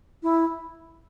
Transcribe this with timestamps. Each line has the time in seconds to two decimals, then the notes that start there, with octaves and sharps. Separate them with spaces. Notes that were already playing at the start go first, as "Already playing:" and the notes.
0.23 E4